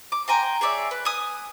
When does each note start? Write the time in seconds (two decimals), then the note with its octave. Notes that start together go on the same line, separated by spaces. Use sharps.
0.12 D6
0.28 G5 G#5 A#5 C6
0.61 G#4 C#5 D5 E5
0.91 B4
1.05 G#5 D#6